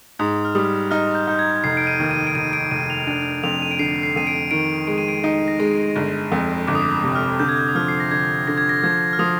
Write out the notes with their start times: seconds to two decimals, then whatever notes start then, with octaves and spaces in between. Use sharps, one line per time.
0.19 G#2 D#6
0.45 F6
0.55 G3 D#6
0.91 D#4 F6
1.15 G6
1.27 D#4 G6
1.39 G#6
1.64 F1 C7
1.77 D7
1.87 D#7
2.00 D#2
2.11 D#7
2.27 D7
2.35 F1 D#7
2.53 D7
2.71 F1 D#7
2.90 F7
3.07 D4 D#7
3.43 F2 F7
3.62 D#7
3.71 D7
3.79 D3 C7
4.03 C7
4.16 F2 D#7
4.27 D7
4.51 D#3 D7
4.87 G#3 D7
4.98 D#7
5.09 D7
5.24 D#4
5.48 A#6
5.59 G#3
5.96 G1
6.32 F2
6.67 G1 D6
6.75 D#6
6.83 D6
6.91 D#6
7.03 C3
7.15 F6
7.40 D3 G6
7.49 G#6
7.59 G6
7.68 D#6
7.75 F3 F6
7.88 C7
8.00 A#6
8.11 D3 G#6
8.47 D3 A#6
8.58 G#6
8.69 A#6
8.83 F3 G#6
9.13 F6
9.19 F3 D#6